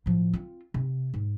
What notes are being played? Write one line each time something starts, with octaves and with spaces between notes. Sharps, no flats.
A2 F3
C4 F4
C3
G#2